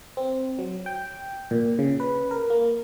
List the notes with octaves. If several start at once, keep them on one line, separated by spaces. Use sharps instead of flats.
C4
F#3
G5
A#2
C#3
B4
A#4
A#3